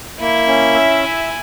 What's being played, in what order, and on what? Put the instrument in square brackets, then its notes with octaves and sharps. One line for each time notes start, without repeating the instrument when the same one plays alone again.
[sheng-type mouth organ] A#3 [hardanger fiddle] E4
[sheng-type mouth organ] C#4
E5
G#5